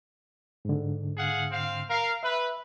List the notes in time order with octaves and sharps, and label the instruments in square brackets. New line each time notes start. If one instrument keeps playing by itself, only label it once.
[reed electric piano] G#2 D3
[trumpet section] G#4 F5 F#5
C4 F5
A#4 F5
[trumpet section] B4 [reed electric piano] E5